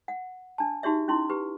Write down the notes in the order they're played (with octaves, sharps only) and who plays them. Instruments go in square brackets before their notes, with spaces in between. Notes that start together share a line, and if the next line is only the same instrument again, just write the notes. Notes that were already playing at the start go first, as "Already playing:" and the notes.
[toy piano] F#5
D4 A5
D#4 F#4 G4 C#5 E5
C#4 D#4 E4 C6
G4 B4